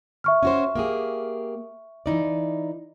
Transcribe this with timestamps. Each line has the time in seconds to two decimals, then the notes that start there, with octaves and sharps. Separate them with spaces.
0.24 E5 C#6 F6
0.43 C#4 F#4 C5
0.75 A#3 G4 G#4
2.06 E3 D#4 D5